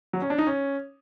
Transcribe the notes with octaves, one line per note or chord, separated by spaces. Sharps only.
F#3
C#4
D4
D#4
C#4